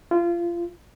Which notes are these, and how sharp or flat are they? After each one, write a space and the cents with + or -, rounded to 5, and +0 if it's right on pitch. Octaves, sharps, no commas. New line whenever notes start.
F4 -25